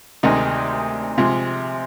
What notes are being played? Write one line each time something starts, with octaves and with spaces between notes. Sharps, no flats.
D2 C3 D#3 G#3 D#4
C3 F3 G#3